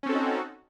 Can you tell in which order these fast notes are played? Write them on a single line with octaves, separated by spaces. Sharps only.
C#4 C4 A4 F#4 D#4